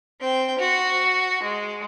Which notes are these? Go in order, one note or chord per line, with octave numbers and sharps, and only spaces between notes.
C4 G5
F#4
G#3